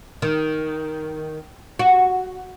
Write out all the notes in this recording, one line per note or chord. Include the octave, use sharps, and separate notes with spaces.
D#3
F#4